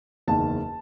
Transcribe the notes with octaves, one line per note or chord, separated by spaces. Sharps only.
F#1 E2 D#3 A5